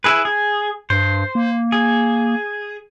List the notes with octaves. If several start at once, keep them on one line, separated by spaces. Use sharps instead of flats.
E4 G#4 B4
G#4
G2 C5
A#3
G#4